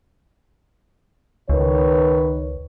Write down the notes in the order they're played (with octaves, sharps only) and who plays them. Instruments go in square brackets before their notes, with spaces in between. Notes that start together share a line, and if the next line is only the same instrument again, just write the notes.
[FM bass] C#2 [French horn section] D#3 B4 C#5